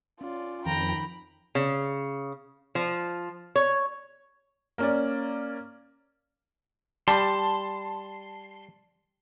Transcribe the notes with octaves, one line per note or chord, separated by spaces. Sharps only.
C#4 F4 D5
F2 D#3 G5 A#5 B5
C#3
F3
C#5
A#3 C#4 D5
G3 A5 C6